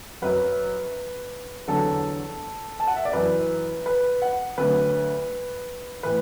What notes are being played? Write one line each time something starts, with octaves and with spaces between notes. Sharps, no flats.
F#2 F#3 B4
E2 D3 F#3 A4
A5
F#5
E5
D5
F#2 E3 B4
B4
F#5
D2 D3 F#3 B4
A2 E3 B4